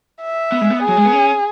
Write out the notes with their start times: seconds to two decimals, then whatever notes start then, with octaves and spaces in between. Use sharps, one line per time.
0.21 E5
0.52 B3
0.61 G#3
0.70 B3
0.82 G#4
0.88 F#3
0.97 G#3
1.05 B3
1.12 C#4